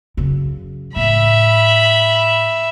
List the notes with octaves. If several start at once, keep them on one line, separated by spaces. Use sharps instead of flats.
F#2 C#3
A2 E5 B5